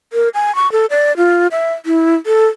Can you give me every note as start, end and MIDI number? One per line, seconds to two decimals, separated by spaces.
0.13 0.29 70
0.34 0.55 80
0.55 0.70 85
0.72 0.86 69
0.90 1.15 74
1.17 1.47 65
1.51 1.73 76
1.86 2.15 64
2.26 2.48 69